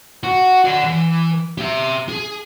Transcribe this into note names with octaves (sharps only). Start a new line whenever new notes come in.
F#4
D5 F#5
E3
G4 E5
G#4